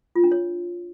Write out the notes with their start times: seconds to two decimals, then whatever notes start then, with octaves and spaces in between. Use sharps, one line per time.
0.16 F4
0.24 D4
0.32 C#5